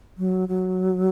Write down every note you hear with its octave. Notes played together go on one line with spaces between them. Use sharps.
F#3
F#3